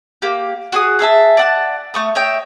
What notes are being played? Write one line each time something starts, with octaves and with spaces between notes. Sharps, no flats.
A#3 G4
F#4 G#4 D#6
G#4 A4 E5 A5
D5 F#5 A5
A3 C#6 D#6
C#5 D#5 E5 G5